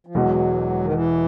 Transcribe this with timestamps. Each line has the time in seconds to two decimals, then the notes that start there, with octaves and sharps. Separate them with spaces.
0.07 F3
0.15 E1 E2 B2 F#3 G#3
0.83 D#3
0.93 E3